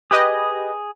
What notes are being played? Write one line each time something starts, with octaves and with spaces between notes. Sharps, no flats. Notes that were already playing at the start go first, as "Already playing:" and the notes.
G4 G#4 B4 D#5 D#6